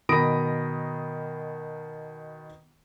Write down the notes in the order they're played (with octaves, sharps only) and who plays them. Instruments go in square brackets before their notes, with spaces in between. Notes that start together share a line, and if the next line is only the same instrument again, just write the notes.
[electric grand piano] B2 D#3 B5 D#6 A#6 D7